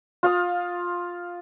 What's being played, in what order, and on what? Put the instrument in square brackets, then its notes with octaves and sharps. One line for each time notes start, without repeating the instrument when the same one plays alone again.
[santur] F4 F5 D#6